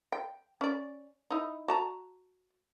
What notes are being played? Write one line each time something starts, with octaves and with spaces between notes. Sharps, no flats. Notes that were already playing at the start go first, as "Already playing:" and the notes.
G5
C#4 D5
D#4 E4
F#4 A5 A#5